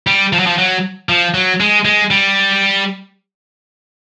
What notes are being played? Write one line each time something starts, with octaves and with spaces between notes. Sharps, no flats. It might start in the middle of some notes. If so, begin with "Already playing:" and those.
G3
F3
F#3
F3
F#3
F3
F#3
G#3
G#3
G3